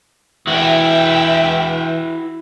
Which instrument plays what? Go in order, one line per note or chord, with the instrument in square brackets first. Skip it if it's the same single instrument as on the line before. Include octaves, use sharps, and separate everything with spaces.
[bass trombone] E3 [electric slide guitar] E4 F#4 [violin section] E5 G5